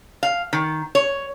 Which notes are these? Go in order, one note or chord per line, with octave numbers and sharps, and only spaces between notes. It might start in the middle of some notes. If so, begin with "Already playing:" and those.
F5
D#3
C#5